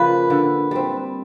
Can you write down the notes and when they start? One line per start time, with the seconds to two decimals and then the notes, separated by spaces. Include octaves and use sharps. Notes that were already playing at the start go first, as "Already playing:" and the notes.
Already playing: C#3 F3 A#3 B4
0.30 D3
0.71 G3 C4